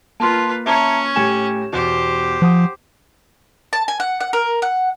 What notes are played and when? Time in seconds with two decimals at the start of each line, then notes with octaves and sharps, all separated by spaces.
0.20 A#3 F4 B4 A5 C6
0.66 C#4 C#5 E5 A5 A#5
1.16 A2 G4 G#5 E7
1.73 E2 B2 G4 C5
2.42 F3 F#5 D#6
3.73 A5
3.88 G#5
4.00 F#5
4.21 F#5
4.33 A#4
4.62 F#5